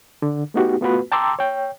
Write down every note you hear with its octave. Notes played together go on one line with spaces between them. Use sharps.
D3
A3 B3 D#4 F#4 G4
A3 B3 F4 F#4 B4
G5 A5 A#5 C6 D6 E6
C#5 G5